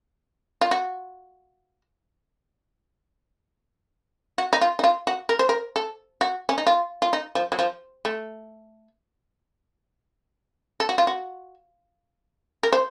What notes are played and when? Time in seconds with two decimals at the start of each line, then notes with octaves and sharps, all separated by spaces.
0.61 F4
0.71 F#4
4.38 F#4
4.53 D#4
4.61 F4
4.79 D#4
4.84 F4
5.07 F#4
5.29 A#4
5.39 C5
5.49 A#4
5.76 A4
6.21 F#4
6.49 C#4
6.58 D#4
6.67 F4
7.02 F4
7.13 D#4
7.35 F3
7.52 F#3
7.59 F3
8.05 A3
10.80 A4
10.89 F#4
10.98 F4
11.07 F#4
12.63 A#4
12.72 C5